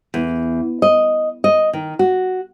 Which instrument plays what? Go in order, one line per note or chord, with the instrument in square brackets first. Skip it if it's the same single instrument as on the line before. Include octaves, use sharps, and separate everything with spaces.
[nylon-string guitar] E2
D#5
D#5
D#3
F#4